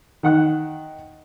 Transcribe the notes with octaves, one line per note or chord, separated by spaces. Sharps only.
D#3 F#5 F#6